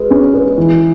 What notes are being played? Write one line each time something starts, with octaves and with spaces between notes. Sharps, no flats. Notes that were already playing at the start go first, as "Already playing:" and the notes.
Already playing: G#3 B4
C#4
B4
E3